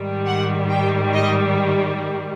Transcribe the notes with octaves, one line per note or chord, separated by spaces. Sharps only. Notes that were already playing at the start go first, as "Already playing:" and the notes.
Already playing: G#2 D#3 G3
F#5
G5
D#5